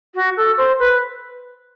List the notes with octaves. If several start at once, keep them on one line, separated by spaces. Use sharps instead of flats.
F#4
A4
C5
B4